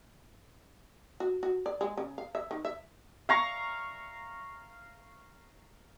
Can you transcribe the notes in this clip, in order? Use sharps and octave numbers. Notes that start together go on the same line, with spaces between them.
F#4
F#4
D5
G#3
C#3
F5
E5
D#3
E5
F5 A#5 C#6